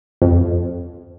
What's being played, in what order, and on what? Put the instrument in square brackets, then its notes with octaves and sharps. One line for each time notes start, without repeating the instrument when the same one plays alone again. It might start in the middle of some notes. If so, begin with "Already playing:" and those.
[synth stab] F2